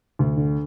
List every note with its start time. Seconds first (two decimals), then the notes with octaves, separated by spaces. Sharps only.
0.19 D2
0.37 D3